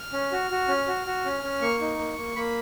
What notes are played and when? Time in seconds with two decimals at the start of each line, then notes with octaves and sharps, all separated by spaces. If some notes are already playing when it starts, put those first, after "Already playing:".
Already playing: F6
0.13 C#4
0.32 F#4
0.51 F#4
0.68 C#4
0.87 F#4
1.06 F#4
1.25 C#4
1.43 C#4
1.61 A#3 C#6
1.80 D#4
1.98 A#3
2.18 A#3
2.36 A#3 B5